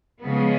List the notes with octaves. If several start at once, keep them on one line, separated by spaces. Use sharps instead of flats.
C#3 F3 G#3 B3